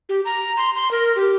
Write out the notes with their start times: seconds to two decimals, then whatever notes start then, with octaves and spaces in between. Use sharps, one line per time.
0.09 G4
0.25 A#5
0.57 C6
0.76 C6
0.91 A#4
1.16 G4